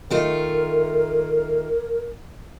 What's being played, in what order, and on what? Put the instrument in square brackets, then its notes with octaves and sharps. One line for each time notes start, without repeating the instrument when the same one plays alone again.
[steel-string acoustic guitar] D#3 A3 F4 [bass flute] A#4